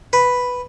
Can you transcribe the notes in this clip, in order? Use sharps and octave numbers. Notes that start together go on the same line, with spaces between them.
B4